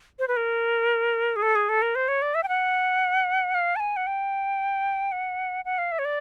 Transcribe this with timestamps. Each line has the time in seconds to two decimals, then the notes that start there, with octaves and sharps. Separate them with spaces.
0.19 C5
0.28 B4
0.37 A#4
1.36 G#4
1.42 A4
1.55 G#4
1.69 A4
1.82 A#4
1.95 C5
2.08 C#5
2.22 D5
2.35 E5
2.43 G5
2.49 F#5
3.54 F5
3.76 A5
3.80 G#5
3.97 F#5
4.07 G5
5.12 F#5
5.65 F#5
5.78 F5
5.92 E5
5.99 C#5
6.05 D5